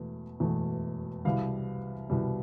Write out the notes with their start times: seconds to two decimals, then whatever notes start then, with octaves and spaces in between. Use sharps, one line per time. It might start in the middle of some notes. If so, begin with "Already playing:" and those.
Already playing: E1 E2 B2 A3
0.40 E1 E2 B2 A3
1.25 C2 B2 G3 F5
2.10 C2 B2 G3